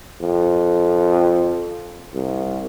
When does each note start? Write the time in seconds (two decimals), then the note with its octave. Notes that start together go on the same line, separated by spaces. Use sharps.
0.21 F2
2.14 C2